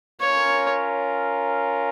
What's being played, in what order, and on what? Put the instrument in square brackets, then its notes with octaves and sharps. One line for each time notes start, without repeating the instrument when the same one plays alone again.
[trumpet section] C#4 F4 A#4 [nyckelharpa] C#5